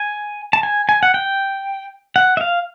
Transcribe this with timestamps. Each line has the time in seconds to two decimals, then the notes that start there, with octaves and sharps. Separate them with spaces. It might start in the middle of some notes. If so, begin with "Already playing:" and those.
Already playing: G#5
0.53 A5
0.63 G#5
0.89 G#5
1.03 F#5
1.14 G5
2.16 F#5
2.37 E5
2.41 F5